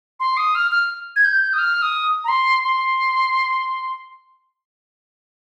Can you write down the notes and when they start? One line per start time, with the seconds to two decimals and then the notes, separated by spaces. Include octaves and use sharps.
0.20 C6
0.37 D#6
0.55 F6
0.71 F6
1.16 G#6
1.25 G6
1.53 D#6
1.58 F6
1.82 D#6
2.24 A#5
2.28 C6
2.64 C6